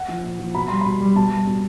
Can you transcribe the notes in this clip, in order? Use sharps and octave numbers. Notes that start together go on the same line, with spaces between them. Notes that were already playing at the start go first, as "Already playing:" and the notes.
Already playing: F#5
F3
A#2
F3
B2 B5
G3 C6
B2 B5
G3
B2 A5
G3
B2